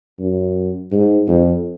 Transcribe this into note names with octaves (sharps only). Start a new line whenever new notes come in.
F#2
G#2
F2